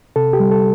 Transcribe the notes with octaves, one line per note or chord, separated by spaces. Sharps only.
C3 A4
G4
G3
A4